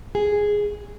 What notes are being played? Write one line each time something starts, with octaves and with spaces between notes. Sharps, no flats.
G#4